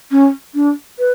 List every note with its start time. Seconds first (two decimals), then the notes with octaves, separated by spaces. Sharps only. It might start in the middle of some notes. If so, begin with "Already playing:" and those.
0.11 C#4
0.55 D4
0.99 B4